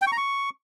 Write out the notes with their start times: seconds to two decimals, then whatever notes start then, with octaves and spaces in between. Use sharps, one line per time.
0.02 G5
0.07 C#6
0.12 A#5
0.17 C#6